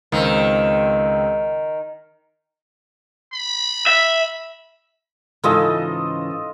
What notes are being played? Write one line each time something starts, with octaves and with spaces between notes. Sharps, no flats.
C#2 D#3 C4
B5
E5
G#2 C#3 E3 F4 A4 D#5